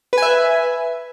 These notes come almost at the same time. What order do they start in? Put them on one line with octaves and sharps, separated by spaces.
B4 G#5 E5